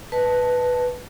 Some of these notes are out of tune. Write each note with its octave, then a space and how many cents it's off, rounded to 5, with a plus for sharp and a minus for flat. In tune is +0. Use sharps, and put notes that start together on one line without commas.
B4 +0 D#5 +0 A5 +0